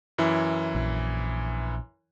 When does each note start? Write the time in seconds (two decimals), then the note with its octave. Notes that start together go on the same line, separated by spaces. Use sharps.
0.18 F#2 E3 E4
0.75 A#1